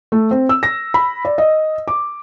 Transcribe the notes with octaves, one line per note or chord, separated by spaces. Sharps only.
A3
C4
E6
A#6
B5
D5
D#5
D6